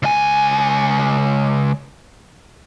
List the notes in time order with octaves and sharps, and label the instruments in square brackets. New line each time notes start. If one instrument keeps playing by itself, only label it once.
[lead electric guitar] C#2 G#5